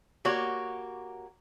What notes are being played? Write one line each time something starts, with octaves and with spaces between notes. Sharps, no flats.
A#3 F#4 G4 C#5